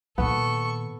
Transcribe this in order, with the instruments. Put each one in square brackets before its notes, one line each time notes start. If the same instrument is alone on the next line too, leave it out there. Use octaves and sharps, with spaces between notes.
[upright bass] A#2 D#3 [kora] B3 [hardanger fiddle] A4 C#6